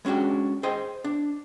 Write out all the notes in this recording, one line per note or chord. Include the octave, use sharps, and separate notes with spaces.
G#3 C#4 D4 F#4 G4
G#4 C5 D#5 G5
D4